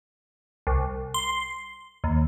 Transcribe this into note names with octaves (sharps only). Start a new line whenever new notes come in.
C2
C6
D#2